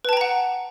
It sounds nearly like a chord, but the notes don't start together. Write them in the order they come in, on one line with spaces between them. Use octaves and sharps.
B4 A5 G5 A#5 F#5